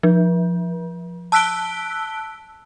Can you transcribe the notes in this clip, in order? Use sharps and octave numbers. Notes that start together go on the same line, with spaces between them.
F3
A5 E6 F#6 B6 D7 G7